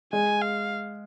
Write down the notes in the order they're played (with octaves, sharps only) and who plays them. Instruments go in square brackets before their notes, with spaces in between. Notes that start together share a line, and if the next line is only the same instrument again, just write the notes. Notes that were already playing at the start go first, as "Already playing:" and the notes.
[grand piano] G#3 [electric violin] G#5
[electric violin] F5